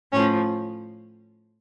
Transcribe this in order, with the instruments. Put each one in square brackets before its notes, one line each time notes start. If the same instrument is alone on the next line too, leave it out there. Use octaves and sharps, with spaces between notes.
[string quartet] A2 F3 C#4